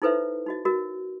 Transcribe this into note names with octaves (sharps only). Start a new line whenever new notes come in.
D#4 E4 A4 B4 C5 E5
D#4 F#4 D#5
F#4 A#4 D#5